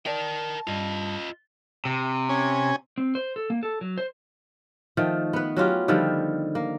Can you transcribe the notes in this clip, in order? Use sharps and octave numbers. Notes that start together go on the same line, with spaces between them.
A#4 D5 G5 A5
G2 F4 D#5
C3
C#4 G#5
C4
C5
A4
A#3
A4
F#3
C5
D#3 F3 A3
B3 B4
F#3 C#4 F4 G4
D3 D#3 F3 G3
A#3